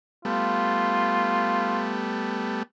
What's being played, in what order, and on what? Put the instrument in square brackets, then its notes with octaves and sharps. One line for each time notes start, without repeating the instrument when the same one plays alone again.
[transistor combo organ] G3 A3 B3 [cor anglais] F4